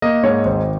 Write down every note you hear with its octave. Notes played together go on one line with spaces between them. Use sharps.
A#3 D#5
G#2 C#5
G#1 C5